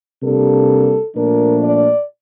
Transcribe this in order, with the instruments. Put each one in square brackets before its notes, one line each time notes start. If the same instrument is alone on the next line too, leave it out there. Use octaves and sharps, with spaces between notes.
[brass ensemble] C3 G3 A#3 D4 A4
A#2 F3 A3 D4 A#4
D5